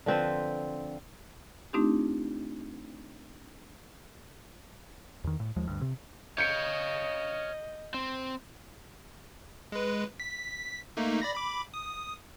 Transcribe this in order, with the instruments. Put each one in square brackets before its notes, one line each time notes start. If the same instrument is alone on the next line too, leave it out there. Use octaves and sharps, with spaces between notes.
[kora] D3 F3 C4 B4
[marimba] A3 C4 D4 D#4 F4 G4
[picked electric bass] E2 D#3
A2
D#2 F3 G#3
D2 G2
C3
[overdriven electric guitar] C#5 F5 [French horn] D#5 [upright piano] G6 C#7 D7
[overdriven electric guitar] C4
[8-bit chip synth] G#3 B4
B6
A3 A#3 D#4
D5 B5 A#6
B5 D6
D#6